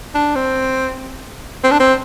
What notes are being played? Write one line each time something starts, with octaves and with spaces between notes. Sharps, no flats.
D4
C4
C4
D4
C4